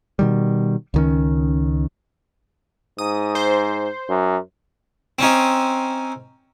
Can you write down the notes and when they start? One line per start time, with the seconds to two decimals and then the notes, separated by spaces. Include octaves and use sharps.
0.19 B2 D#3 G3
0.94 C#2 D#3 C#4
2.98 G#2 D#6
3.35 C5
4.09 F#2
5.19 C4 C#4 D#4